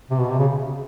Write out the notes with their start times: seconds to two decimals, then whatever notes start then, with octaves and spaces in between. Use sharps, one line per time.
0.11 C3
0.19 B2
0.30 C3
0.39 C#3